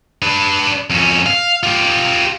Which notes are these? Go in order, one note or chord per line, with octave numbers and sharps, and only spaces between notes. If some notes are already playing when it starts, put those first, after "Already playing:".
D4 B4
F2 C#4
F5
F4 G4